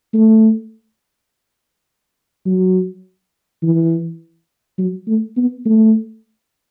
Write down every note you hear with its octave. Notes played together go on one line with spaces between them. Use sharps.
A3
F#3
E3
F#3
A3
B3
A3